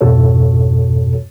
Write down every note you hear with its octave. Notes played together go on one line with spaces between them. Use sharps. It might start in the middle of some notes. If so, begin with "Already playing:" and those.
F2 G#2 B2 F#4 A4 C#5